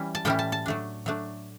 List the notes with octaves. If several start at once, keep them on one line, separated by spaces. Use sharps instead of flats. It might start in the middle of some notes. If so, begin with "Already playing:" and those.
Already playing: E3 G3 C#4 E4
A5
A2 E3 G3 C#4 E4 G5
A5
A5
F#3 A3 D4
F#3 A3 D4